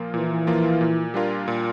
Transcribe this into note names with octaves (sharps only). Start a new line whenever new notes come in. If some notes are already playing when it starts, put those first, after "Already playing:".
Already playing: A#2 F3 A#3 F4
A#2 E3
F3 A#3 F4
A#2
G3 D4 F4 A#4
A#2